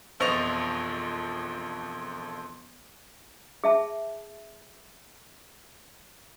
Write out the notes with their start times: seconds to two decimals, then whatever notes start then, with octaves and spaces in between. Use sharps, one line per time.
0.20 E1 F2 F3 D#5 C#6 F7
3.64 G#4 E5 A5